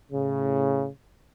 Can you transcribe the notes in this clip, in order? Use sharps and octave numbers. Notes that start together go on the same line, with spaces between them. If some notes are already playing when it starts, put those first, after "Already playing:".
A2 C#3